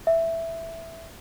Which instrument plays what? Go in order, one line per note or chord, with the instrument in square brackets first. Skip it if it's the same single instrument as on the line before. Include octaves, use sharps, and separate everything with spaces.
[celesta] E5